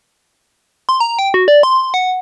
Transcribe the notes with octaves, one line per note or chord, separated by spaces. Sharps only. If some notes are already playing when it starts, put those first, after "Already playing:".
C6
A#5
G5
F#4
D5
C6
F#5